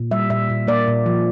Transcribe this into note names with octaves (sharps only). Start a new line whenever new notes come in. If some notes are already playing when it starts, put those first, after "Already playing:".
Already playing: A#2
G3 E5
A#2 E5
A#2
A#3 D5
A#2
F3